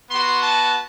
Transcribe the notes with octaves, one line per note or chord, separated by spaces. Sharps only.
B3 F#4 C6
A5